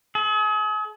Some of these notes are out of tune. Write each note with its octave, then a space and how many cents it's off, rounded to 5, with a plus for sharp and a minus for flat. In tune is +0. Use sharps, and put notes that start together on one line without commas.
G#4 +40